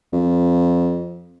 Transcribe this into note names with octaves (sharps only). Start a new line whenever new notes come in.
F2